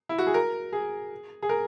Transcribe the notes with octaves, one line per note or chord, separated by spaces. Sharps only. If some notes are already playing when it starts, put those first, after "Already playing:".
E4
F#4
G#4
A#4
G#4
G#4
A#4